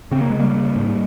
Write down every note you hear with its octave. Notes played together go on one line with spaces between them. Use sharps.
C#3 C4
A#3
C#3 G#3
G3 A#3
C#3
G#2